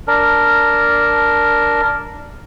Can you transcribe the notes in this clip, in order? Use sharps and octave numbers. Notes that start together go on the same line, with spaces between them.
D4 A#4